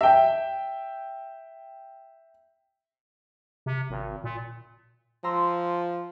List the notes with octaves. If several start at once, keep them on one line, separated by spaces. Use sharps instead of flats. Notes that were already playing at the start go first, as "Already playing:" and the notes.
E5 G5
C3
G#1
A#2
F3 A#5 C6 E6